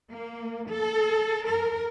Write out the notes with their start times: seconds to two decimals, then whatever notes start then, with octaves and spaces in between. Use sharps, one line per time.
0.11 A#3
0.71 A4
1.48 A#4